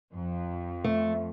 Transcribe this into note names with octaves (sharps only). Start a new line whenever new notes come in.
F2
A3